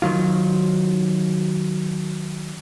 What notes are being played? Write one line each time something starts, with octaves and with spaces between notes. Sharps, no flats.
D#3 F#3 F4